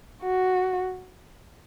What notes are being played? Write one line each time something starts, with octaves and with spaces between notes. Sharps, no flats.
F#4